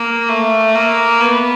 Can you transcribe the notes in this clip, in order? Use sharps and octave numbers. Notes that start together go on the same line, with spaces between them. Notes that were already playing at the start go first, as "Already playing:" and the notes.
Already playing: A#3
A3
A#3
B3